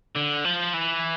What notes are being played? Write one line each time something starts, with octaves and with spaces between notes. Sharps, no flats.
D3
F3
E3